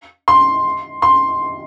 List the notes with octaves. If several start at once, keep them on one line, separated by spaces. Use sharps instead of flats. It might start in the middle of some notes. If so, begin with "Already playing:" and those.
C6
C6